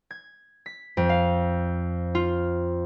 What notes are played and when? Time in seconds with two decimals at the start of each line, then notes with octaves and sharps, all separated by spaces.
0.11 G#6
0.66 B6
0.97 F2
1.09 F5
2.15 F4